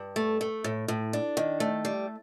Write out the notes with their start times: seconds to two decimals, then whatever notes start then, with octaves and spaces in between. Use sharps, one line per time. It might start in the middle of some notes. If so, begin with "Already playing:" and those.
Already playing: G2
0.16 A3
0.41 A3
0.64 A2
0.88 A2
1.13 D4
1.37 D#3
1.60 A3
1.85 G3